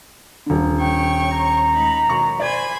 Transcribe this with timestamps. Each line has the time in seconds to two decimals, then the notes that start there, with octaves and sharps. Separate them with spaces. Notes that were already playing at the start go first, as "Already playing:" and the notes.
0.46 D#1 D3
0.80 C#5 G5 C#6
1.31 A#5
1.72 G#3 D#4 B5
2.10 F#2 B2 D#3 C#6
2.40 C5 D5 G#5 B5 G#6